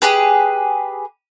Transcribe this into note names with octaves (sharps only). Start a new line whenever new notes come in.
G4 G#4 B4